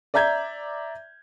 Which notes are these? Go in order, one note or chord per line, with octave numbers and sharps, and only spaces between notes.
D5 E5 A#5 G6 G#6